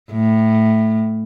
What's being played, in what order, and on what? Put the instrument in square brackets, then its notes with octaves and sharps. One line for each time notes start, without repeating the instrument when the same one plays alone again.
[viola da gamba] A2